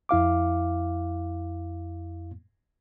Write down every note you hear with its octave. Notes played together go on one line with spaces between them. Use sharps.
F2 E4 F5 D6